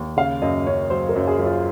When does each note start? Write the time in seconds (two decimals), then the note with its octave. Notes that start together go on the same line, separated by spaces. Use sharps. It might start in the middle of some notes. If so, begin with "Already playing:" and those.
Already playing: D#2
0.17 C#3 F5
0.42 F#2 D#5
0.67 F#2 C#5
0.90 F#3 C5
1.09 A#4
1.16 F#2
1.27 G#4
1.39 F#2
1.46 F4